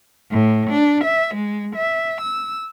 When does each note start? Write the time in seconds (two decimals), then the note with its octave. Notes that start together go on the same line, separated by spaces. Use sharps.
0.31 A2
0.71 D4
1.04 E5
1.35 G#3
1.76 E5
2.22 E6